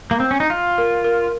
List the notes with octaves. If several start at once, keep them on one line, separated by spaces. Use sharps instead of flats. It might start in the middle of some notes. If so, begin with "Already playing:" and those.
A#3
C4
C#4
D#4
F4 F5
A#4
A#4